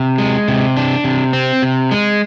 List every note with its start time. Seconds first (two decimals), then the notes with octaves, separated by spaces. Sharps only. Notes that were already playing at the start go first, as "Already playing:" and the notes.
Already playing: C3
0.18 G#3
0.48 C3
0.77 D4
1.04 C3
1.33 C4
1.62 C3
1.91 G#3